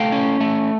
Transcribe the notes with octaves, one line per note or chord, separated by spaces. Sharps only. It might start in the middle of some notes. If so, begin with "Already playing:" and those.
Already playing: A3 F5 G5
C#4
A3